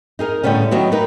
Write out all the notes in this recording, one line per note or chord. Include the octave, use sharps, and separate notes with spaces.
D#4 G#4 A#4
A2 D3 G3 B3 C#4
D#3 F#3 B3 F#4 G4
D#4 A#4 B4